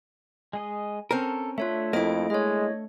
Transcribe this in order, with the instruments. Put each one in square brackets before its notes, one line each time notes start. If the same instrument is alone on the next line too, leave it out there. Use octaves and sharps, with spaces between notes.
[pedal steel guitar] G#3 G#4 D#5
[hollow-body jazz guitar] C4 C#4 A#4 [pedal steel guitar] A4
[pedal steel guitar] A3 D4 [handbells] F4 C#5 E5
[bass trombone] F2 [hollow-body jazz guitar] A#3 E4 [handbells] D#5 D7
[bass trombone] G#3 [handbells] C#5 D#5